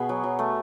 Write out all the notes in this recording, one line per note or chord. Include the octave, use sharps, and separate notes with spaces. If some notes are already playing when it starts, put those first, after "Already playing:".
Already playing: B2 B3 G#4
F#3
F#3
A3